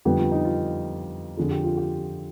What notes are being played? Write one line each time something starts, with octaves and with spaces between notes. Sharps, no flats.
F2 D3 G3 B3 G4
F4
D#4
F4
F2 D3 F3 G#4
G4
F4
G4